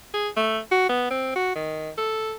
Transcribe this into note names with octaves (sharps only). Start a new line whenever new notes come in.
G#4
A3
F#4
B3
C4
F#4
D#3
A4